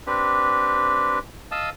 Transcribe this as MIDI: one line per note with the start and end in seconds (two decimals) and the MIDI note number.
0.07 1.19 60
0.07 1.19 62
0.07 1.19 67
0.07 1.19 71
1.51 1.69 75
1.51 1.69 77
1.51 1.69 81
1.51 1.69 87
1.51 1.69 88